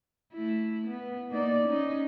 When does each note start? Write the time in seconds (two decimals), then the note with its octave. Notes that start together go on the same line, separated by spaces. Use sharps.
0.34 A3 E4
0.87 B3
1.31 A#3 D#4 D5
1.64 C#4 D#4